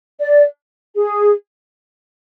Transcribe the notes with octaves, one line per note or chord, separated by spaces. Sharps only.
D5
G#4